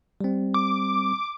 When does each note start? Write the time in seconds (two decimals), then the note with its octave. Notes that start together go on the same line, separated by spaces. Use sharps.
0.21 G3 C4
0.54 D6